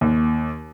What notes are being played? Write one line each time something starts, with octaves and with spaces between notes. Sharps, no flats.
D#2